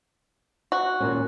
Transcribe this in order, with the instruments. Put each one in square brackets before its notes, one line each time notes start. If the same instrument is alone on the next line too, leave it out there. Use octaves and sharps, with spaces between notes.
[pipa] F#4
[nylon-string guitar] D#2 A#2 C#4